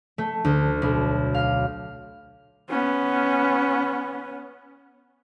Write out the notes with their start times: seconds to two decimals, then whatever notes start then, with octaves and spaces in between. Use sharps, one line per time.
0.18 A3
0.45 D2
0.82 B1
1.34 F5
2.69 B3 C#4